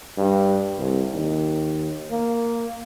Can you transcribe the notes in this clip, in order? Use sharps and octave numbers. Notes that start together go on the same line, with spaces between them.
G2
C2
D#2
A#3